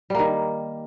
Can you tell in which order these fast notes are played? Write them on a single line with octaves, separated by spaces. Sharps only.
G3 A#3 D#3